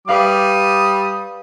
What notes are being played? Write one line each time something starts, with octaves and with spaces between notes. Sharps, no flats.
G3 B4 F5 D6 D#6